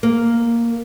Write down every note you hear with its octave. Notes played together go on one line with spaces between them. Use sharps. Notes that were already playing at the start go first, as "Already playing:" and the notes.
A#3